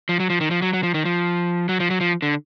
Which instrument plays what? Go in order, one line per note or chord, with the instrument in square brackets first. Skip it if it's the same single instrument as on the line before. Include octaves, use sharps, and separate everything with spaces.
[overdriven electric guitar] F3
F#3
F3
D#3
F3
F#3
F#3
F3
D#3
F3
F#3
F3
F#3
F3
D3